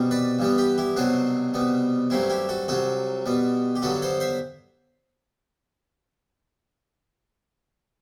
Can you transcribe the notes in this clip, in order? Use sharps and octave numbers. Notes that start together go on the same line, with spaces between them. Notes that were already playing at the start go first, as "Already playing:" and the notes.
Already playing: C2 B2 G3
B4 D5
G2 E3 G3 B3
G4 B4
E4 G4
C2 B2 F#3 C4 D4 F#4
C2 B2 G3 B3
G2 F#3 A3 C4 E4
E4 G4
F#4 A4
C2 C3 F#3 F#4 A4
B2 G3 B3
G4
G2 D3 F#3 B3 F#4 A4
A4 C5
C5 E5